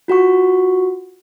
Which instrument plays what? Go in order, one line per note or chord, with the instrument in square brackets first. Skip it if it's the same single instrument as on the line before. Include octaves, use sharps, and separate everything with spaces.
[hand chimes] F4 F#4 F#5 C#6